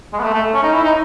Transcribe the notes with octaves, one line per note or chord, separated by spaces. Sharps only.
G#3
B3
A3
A3
C#4
D#4
E4
D#4